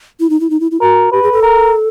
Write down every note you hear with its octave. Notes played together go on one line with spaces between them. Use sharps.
E4
D#4
E4
D#4
E4
E4
F#4 A#4
G4 B4
G#4
A4
A#4